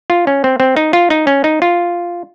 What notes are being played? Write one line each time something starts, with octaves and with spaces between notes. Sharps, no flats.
F4
C#4
C4
C4
D#4
F4
D#4
C#4
D#4
F4